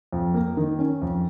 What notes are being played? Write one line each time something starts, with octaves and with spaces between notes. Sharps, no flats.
F2
A#3
D#3
C#4
F2